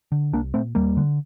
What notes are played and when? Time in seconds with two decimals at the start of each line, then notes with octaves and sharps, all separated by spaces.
0.12 D3
0.33 C2 A#3 D4
0.54 A#2 A3 C4
0.75 D#2 G3 A#3
0.97 D3